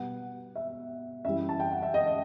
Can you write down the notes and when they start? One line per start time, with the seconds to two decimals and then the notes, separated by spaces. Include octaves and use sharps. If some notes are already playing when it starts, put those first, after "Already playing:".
Already playing: B2 G3 B3 F#5
0.56 E5
1.25 F#2 E3 G3 E5
1.49 A5
1.60 G5
1.71 F#5
1.82 E5
1.94 D#5
2.06 D#5